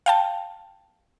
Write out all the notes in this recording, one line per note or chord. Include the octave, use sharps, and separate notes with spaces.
F5 G5 A5